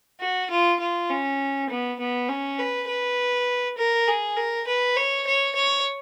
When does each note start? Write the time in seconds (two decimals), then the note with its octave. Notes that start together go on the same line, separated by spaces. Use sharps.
0.20 F#4
0.50 F4
0.80 F4
1.10 C#4
1.70 B3
1.99 B3
2.29 C#4
2.59 B4
2.88 B4
3.78 A#4
4.08 G#4
4.37 A#4
4.67 B4
4.96 C#5
5.27 C#5
5.55 C#5